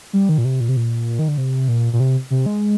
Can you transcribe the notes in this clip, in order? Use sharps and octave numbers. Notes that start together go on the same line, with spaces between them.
G3
D#3
A#2
C3
A#2
C3
A#2
D#3
D3
C3
A#2
A#2
C3
C3
G#3